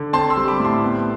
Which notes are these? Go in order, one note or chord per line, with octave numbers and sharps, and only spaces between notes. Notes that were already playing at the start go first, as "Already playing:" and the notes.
Already playing: D3
C4 A5 C6
C6 E6
G3
B5 D6
A2
A5 C6
B3